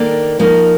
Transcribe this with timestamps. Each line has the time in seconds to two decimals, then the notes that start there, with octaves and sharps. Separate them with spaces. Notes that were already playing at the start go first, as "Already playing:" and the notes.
Already playing: D#3 A#3 D4 A4 D5
0.39 F3 A#3 D#4 A#4